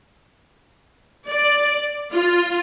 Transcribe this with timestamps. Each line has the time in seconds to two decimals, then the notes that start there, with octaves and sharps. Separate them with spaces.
1.28 D5
2.12 F4